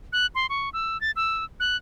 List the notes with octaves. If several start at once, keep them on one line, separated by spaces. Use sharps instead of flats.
F#6
C6
C#6
E6
A6
E6
F#6